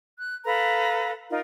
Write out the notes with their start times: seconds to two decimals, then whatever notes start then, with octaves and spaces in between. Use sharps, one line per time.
0.19 F#6
0.45 A4 B4 F5 A#5
1.29 D#4 F4 A#4